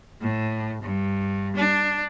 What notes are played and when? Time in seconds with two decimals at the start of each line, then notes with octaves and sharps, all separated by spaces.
0.21 A2
0.83 G2
1.56 D4